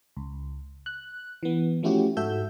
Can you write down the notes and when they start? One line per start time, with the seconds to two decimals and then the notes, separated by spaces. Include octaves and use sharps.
0.17 C#2
0.86 F#6
1.43 E3 B3
1.83 F3 A3 C#4 E4 F#4 G4
2.17 G#2 F#4 A4 E5 E6 G6